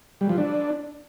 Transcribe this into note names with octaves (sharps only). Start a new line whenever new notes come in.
G3
F3
D4